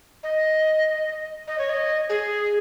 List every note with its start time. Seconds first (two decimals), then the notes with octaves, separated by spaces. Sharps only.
0.23 D#5
1.48 D#5
1.58 C#5
1.69 D#5
2.09 G#4